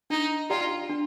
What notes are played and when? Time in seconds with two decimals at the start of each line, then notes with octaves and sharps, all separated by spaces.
0.10 D4 D#4
0.50 F4 G4 D5 G5 A#5
0.90 D4